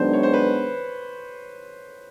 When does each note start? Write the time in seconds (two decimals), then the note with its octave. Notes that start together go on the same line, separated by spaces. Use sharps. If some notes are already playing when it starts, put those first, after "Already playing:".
Already playing: F#2 D#3 G#3 B3 D4 C5
0.13 C#5
0.23 C5
0.33 B4